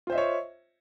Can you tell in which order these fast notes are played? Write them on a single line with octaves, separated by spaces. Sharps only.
F4 C5 E5 D#5 C#5